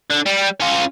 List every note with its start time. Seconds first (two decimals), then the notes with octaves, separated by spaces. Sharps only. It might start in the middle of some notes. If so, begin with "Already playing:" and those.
0.11 D3
0.26 G3
0.60 C#4 F4